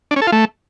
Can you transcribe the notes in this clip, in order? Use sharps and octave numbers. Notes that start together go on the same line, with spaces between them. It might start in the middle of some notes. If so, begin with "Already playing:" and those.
D4
C#4
A4
F4
A3